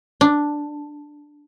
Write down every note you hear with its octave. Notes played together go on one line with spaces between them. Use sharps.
D4